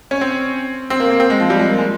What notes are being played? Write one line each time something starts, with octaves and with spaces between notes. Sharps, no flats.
C#4
C4
C4
A#3
A#3
C4
G#3
F3
G3
G#3
A#3
G#3